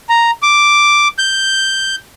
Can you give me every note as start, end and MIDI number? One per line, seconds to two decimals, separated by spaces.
0.09 0.31 82
0.43 1.08 86
1.19 1.96 91